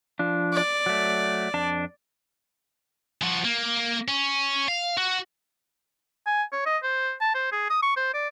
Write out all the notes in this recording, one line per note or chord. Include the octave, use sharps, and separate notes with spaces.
F3 D4
D5
F#3 A3
F2 D4 A5
F3 F#4
A#3
C#4
F5
F#4
G#5
C#5
D#5
C5
A5
C5
G#4
D#6
C#6
C5
D5